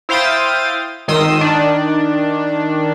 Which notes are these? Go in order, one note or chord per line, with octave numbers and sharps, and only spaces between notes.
E4 C5 F5 G5 D#6 A6
G#1 D#3 C6 D#6 E6
D#3 D4